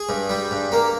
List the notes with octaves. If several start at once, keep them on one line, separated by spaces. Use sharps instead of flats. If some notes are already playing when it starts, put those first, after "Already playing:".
Already playing: G#4
G2
G3
G2
A#3